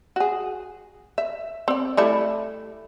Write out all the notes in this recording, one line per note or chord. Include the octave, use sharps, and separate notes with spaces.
F#4 G#4
E5
C4 D5
G3 A3 E4